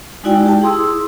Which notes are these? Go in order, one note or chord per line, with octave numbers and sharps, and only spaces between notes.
G#3 D#4 E4 F#4 D5 G5
G4 G5 A5
E4 G#4 C6 D#6 E6